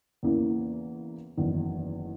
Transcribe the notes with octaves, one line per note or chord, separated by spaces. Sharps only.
E2 C#3 E3 A#3
F#1 E2 D#3